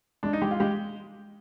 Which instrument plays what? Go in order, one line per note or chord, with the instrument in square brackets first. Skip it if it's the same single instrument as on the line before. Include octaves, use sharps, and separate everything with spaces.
[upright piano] G#3 [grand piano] D4
[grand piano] D#4
[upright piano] G#3 [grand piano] G4
[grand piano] F4
[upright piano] G#3 [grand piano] G4